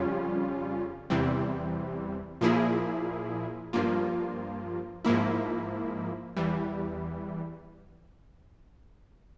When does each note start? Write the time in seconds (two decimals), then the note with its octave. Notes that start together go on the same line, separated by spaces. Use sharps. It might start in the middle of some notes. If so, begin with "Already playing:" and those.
Already playing: F2 C#3 G3 C#4 F4
1.10 E2 C3 E3 G3 C4
2.41 A#2 F3 A#3 E4 G#4
3.73 G2 F3 A#3 F4
5.04 G#2 F3 A#3 E4
6.36 E2 E3 G3